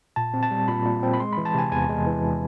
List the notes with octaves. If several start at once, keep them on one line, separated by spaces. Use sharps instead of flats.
A#2 A5
C4
A5
G3
A#2 B5
A#2
C4
B5
G#3 C6
E3 B5
A5
C3 G#5
E2 G#5
G#3
E3